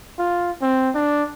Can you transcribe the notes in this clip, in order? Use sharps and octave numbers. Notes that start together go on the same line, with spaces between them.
F4
C4
D4